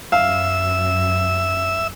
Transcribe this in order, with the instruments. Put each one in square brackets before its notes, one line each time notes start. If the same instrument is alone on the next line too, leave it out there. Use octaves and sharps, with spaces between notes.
[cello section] F#2 [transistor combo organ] E5 E6 [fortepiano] F5